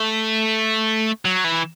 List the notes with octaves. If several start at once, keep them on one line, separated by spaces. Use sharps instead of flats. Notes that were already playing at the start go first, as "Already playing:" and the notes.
Already playing: A3
F#3
E3